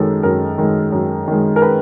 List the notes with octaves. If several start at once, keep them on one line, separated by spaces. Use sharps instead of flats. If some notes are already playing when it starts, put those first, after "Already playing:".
Already playing: F#2 D#3 G#3 A4
F#2 A#4
D#3 G#3
F#2
D#3 G#3
A#4
B4